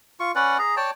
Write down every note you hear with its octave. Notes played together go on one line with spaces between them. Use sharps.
F4 C#6
C#4 B4 D5 F#5
G#4 A#5
C#5 D5 G5 A5